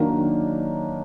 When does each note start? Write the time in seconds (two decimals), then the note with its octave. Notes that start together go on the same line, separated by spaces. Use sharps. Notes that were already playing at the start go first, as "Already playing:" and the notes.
Already playing: D#3 F#3 A#3 D4